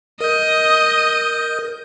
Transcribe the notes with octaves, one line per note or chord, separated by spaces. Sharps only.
A#4 D#5 G6